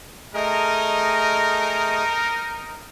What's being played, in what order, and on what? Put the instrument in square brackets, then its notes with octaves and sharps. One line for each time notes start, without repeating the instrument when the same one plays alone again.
[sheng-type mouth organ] A3 G#4 D#5 [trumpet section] D#4 A#4